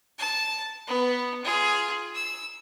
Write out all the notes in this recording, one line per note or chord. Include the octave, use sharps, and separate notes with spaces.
A5
B3
F4 G#4
E6